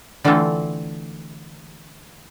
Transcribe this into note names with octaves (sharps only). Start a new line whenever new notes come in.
D3 E3 A3 C4 F4 A4